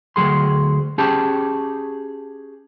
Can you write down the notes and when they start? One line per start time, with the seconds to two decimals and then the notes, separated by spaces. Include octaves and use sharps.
0.16 D2 B2 F#3 G#4 C6
0.98 C#4 G4 G#4 A5